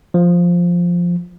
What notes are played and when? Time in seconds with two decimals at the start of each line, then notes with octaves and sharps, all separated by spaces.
0.14 F3